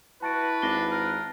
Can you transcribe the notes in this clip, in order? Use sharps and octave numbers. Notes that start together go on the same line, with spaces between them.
E4 F#4 B4 A5 A6 D7
G#1 D4 A#6 C7 G7
A#4